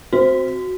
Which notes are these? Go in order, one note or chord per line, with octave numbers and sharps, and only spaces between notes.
C4 F#4